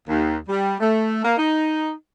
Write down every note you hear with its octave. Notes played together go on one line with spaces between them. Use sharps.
D#2
G3
A3
A#3
D#4